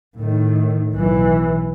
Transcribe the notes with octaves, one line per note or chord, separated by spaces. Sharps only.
A2 D#3
B1 E3